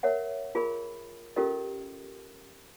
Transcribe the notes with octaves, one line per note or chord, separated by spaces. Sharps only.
A#4 C#5 E5 F#5
F4 G#4 A#4 B5
C#4 F4 G4 A4 A#4 D#5